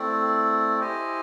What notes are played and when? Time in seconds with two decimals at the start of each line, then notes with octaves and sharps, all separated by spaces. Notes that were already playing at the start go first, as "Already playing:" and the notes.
Already playing: A3 C4 E4 A4 D5
0.79 E4 G4 C5 D#5 G#5